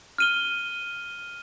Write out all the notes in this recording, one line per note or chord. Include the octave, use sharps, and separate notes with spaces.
F6 D#7 G7